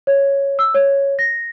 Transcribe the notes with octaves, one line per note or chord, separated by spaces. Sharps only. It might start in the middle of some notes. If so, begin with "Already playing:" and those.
C#5
E6
C#5
A#6